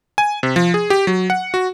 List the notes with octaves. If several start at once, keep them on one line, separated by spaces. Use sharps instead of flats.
G#5
C3
F3
G#4
G4
F#3
F#5
F#4